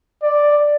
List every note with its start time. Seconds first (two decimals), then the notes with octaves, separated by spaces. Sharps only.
0.23 D5